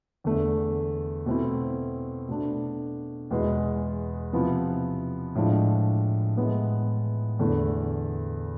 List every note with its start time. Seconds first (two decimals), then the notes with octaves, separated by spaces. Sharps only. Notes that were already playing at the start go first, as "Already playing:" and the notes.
0.24 E2 D3 A3
1.26 B2 A3 C4 E4
2.28 B2 A3 D4
3.31 E2 B2 G#3 B3 E4
4.33 C3 F3 B3 E4
5.35 A2 F3 G#3 D4
6.37 A2 E3 G#3 B3
7.39 E2 D3 A3 E4